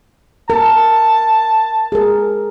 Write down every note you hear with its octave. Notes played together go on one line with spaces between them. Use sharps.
A#4 A5
G#4 A#4